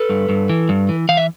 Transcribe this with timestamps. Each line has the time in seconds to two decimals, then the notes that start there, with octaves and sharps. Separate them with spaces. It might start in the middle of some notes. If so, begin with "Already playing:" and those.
Already playing: A4 B4
0.10 G2
0.29 G2
0.49 E3
0.69 G2
0.89 E3
1.09 E3 F5
1.17 E5